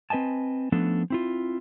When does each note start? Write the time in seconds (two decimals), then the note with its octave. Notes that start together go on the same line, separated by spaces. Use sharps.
0.10 C4 B4 D#5 G#5 A5
0.72 F3 A3 B3 C#4 D4 A4
1.10 C4 E4 F4